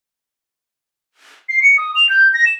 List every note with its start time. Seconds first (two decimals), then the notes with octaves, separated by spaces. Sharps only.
1.49 C7
1.62 C#7
1.78 D#6
1.96 F7
2.09 G6
2.34 A#6
2.46 E7